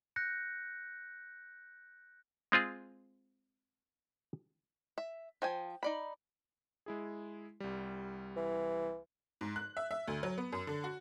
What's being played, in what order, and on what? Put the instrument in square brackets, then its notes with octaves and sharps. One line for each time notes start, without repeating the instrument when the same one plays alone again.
[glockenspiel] F#6 G6 A#6 C#7
[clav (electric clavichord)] G#3 C4 F4 G#4
[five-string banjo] E5
F3 G5 G#5
D#4 D5 B5
[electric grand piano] G#3 E4 G#4
C2 G3
[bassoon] E3
[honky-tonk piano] G#2
F#6
E5
E5
D2
F#3
B3
F#2
D3
F#4